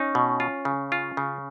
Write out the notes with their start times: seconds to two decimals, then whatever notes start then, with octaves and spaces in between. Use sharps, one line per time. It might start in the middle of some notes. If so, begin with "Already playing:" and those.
Already playing: C#4 D#4
0.15 B2
0.40 F4
0.65 C#3
0.92 F4
1.17 C#3